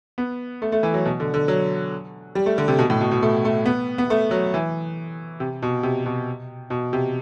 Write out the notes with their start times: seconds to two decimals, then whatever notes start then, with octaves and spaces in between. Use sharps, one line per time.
0.18 B3
0.62 A3
0.72 A3
0.83 E3
0.94 F#3
1.05 B2
1.20 D3
1.34 D3
1.48 F#3
2.35 G3
2.46 A3
2.58 D3
2.68 C3
2.79 B2
2.90 A2
3.01 B2
3.11 B2
3.22 A3
3.45 A3
3.66 B3
3.98 B3
4.10 A3
4.31 F#3
4.54 E3
5.40 C3
5.62 B2
5.83 C3
6.06 B2
6.70 B2
6.93 C3